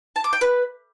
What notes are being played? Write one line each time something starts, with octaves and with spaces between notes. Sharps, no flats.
A5
D6
G5
B4